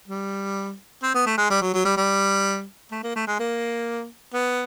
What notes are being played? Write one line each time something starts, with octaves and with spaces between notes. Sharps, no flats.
G3
C4
B3
A3
G#3
G3
F#3
F#3
G3
G3
A3
A#3
A3
G#3
A#3
B3